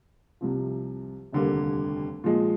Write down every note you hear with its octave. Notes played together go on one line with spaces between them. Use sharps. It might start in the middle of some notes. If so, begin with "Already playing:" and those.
C2 C3 F3
F1 D#2 D3 G3 A#3
A#2 F3 G#3